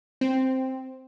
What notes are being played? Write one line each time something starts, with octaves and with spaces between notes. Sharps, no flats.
C4